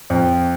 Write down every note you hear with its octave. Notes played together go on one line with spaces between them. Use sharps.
F2